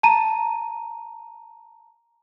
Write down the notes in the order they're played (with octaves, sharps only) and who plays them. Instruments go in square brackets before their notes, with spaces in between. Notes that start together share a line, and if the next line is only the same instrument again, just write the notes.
[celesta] A5 A#5 D#7